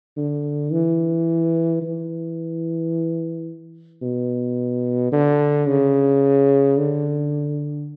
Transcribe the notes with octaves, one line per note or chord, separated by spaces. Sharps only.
D3
E3
E3
B2
D3
C#3
D3